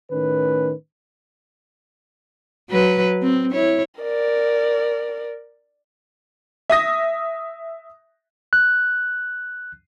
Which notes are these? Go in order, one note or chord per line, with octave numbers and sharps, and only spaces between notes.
A2 D#3 C#4 B4
F#3 B4
C4
E4 C#5
A#4 D5
E5 D#6 A#6
F#6